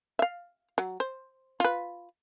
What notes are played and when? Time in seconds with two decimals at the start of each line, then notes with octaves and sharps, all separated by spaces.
0.19 E5 F5
0.78 F#3
1.00 C5
1.60 F4 B4